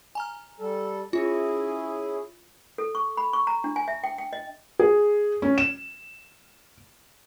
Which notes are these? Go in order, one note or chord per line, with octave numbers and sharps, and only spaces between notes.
G#5 A#5 F6
G3 A4
C#4 E4 F4 G#4
A4
C#6
B5
C#6
A#5
D4
G#5
E5
G5
G5
D#5
G#4
C#4
E7